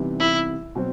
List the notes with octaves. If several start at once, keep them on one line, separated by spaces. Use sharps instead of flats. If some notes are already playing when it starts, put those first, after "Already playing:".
Already playing: C3 E3 G3 B3 D#4
E4
B2 F#3 C4